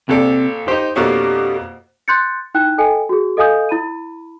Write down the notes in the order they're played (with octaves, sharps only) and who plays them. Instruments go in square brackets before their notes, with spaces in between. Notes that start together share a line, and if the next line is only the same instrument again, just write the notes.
[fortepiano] A#1 A4 D5 [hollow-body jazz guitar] C3
[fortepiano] D#4 G4 [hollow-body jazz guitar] C5
[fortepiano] F2 B2 A#3 [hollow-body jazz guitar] D4 A4 C#5 [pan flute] G4
[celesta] C6 F#6 G6 A6 C#7
D#4 E4 G5 F#6
A4 D#5 G5 G#5
F#4 G#4
A4 D#5 F5 G#5 D#6 G6
E4 B5 D#7